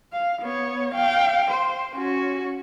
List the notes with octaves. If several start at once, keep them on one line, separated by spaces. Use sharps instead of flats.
F5
B3 C#5
F5 G5
C5
C#4 F#4